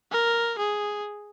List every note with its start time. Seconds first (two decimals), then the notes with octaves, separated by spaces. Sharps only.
0.12 A#4
0.59 G#4